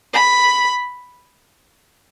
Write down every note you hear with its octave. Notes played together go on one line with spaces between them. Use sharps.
B5